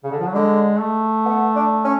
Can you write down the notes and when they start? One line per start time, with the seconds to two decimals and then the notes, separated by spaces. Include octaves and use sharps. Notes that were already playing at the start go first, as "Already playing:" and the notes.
0.04 C#3
0.11 D3
0.20 F3
0.27 F#3
0.35 D3 G#3
0.80 A3
1.25 B3
1.55 D4
1.84 C#4